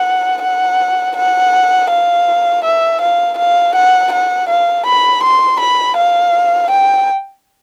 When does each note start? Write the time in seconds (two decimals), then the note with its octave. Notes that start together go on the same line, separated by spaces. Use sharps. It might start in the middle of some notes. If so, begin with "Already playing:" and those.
Already playing: F#5
0.43 F#5
1.17 F#5
1.91 F5
2.64 E5
3.01 F5
3.38 F5
3.75 F#5
4.12 F#5
4.49 F5
4.86 B5
5.23 C6
5.60 B5
5.97 F5
6.71 G5